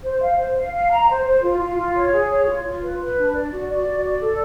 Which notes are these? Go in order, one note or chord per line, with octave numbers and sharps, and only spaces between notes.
C5
F5
C5
F5
F5
A#5
C5
C5
F4
F4
F4
C#5
G#4
C#5
F4
F4
B4
B4
D4
D5
F#4
D5
F#4
D5
A4